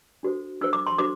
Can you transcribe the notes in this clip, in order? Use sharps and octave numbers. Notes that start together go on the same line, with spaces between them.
D4 F#4 A4 C5
D4 F#4 A4 C5 E6
D6
C6
D4 F#4 A4 C5 D6